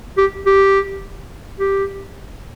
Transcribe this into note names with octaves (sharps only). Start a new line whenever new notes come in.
G4
G4
G4